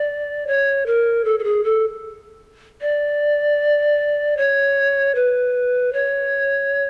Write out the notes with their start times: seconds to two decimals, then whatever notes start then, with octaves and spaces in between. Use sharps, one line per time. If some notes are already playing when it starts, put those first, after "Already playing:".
Already playing: D5
0.47 C#5
0.86 A#4
1.25 A4
1.39 A4
1.44 G#4
1.64 A4
2.81 D5
4.37 C#5
5.15 B4
5.93 C#5